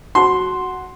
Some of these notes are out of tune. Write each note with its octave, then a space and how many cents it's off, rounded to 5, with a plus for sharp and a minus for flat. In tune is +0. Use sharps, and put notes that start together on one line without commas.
F#4 +0 A5 -20 C6 +0